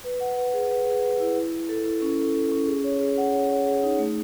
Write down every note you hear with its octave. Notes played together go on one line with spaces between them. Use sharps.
B4
F#5
B4
G#4
B4
G#4
B4
E4
E4
E4
A4
E4
C#4
A4
A4
C#4
G#4
C#5
G#4
F#5
C#5
C#5
G#4
D#4
A3